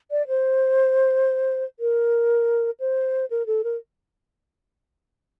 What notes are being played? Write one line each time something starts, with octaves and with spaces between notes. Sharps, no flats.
D5
C5
A#4
C5
A#4
A4
A#4